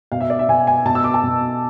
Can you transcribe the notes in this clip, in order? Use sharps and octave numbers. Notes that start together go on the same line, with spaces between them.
B2 F5
E5
D5
E5
B2 G#5
G#5
B2 A5
E6
D6
A5
B2